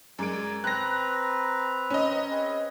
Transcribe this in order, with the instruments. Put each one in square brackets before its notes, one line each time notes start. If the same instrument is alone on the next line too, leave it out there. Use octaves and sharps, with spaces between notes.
[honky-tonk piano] F#2 G#3 D7 [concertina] D5 G#5
[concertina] C4 B4 A#5 [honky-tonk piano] F#6 A#6
[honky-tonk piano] C#4 D#5
[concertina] C4 G#4 B4